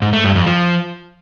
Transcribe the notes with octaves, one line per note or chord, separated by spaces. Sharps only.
G#2
A3
G2
F2
F3